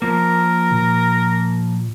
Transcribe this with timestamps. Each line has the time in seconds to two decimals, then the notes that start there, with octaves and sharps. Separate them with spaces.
0.02 F3 A#3 A#4
0.71 A#2